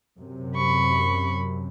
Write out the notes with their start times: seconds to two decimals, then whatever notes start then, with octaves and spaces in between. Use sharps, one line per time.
0.19 F#2 C3
0.56 B5 C#6